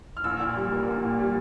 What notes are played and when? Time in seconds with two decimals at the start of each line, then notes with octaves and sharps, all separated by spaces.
0.17 F6
0.24 A#1 E6
0.40 A#2
0.56 G3
0.72 A#3
0.88 A#1
1.04 A#2
1.19 G3